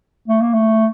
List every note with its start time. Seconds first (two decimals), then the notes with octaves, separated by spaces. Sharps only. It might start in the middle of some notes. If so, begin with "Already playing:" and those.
0.28 A3
0.41 A#3
0.54 A3